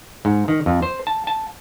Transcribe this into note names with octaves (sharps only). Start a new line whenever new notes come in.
G#2
D#3
F2
C5
A5
A5